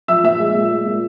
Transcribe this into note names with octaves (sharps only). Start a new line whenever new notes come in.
F3 E5 E6
A#2 E5 E6
G#3
A#2
G#3
A#2